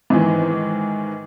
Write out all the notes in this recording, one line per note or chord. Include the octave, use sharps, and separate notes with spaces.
G#2 D#3 E3